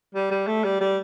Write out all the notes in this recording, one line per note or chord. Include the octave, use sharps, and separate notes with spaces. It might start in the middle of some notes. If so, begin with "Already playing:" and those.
G3
G3
A3
G3
G3